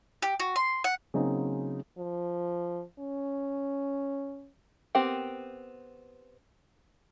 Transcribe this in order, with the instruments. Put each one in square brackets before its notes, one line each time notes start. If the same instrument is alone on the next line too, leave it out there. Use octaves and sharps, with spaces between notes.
[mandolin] G4
F#4
C6
F#5
[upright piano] C#3 F#3 A#3 C4 C#4 D#4
[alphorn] F3
C#4
[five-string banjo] B3 C4 G4 A#4 G5